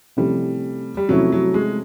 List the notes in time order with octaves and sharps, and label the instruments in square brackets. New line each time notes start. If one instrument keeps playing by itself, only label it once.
[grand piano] C3 F3 A3 C#4 E4 [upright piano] G3
[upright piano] G3
[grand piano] C3 F3 A3 C#4 E4 [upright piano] F#3
[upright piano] F#3
G#3